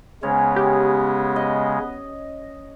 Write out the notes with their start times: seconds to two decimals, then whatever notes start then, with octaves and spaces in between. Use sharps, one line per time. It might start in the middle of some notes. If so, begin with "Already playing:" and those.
0.23 C#3 G#3 B3 C#4 C#5
0.56 G4
1.36 D#5